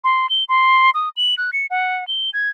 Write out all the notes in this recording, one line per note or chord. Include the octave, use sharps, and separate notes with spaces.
C6
G7
C6
D#6
F#7
F#6
C#7
F#5
G7
G#6